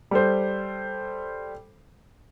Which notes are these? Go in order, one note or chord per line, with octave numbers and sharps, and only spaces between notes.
G3 A4 C5